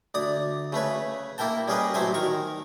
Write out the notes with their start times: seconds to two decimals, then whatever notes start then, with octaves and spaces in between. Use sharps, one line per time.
0.14 D2 D5 D#6
0.72 C#3 A3 B4 C#5
1.38 A#3 E4 A#4 G5 A5
1.68 G3 C#4 G#4 A#4 B4 D#5
1.94 A1 F#3 A3 C5 G#5
2.14 D#3 A#4 C#6